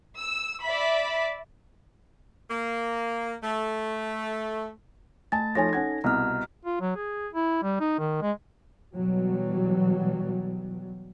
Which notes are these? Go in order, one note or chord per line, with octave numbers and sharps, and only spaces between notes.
E6
D5 E5 B5
A#3
A3
A3 G#5 A5 A6
F3 D#4 A4 C#5 G#5 A#6
C#4 F#5 G#6
C2 B2 A#5 F6
F4
F#3
G#4
E4
G3
D#4
D#3
G#3
B2 E3 F#3 G3